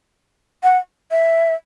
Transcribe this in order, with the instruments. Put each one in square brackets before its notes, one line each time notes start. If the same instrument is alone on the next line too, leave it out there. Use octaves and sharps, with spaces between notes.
[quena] F#5
E5